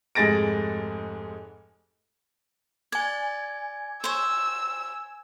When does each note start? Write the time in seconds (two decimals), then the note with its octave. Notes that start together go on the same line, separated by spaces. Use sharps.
0.15 F1 G#2 G#4 A6 A#6 D7
2.92 D5 G#5 G#6
4.04 C5 C#5 E6